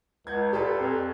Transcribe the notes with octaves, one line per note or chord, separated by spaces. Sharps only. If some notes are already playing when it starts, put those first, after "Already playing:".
C#2 F#5 G6 G#6
A#2 G4 A4 B4
F2